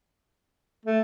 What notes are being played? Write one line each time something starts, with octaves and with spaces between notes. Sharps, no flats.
A3